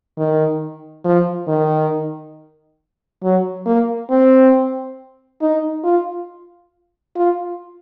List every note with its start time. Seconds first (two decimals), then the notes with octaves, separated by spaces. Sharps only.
0.17 D#3
1.05 F3
1.47 D#3
3.23 F#3
3.66 A#3
4.10 C4
5.41 D#4
5.84 F4
7.16 F4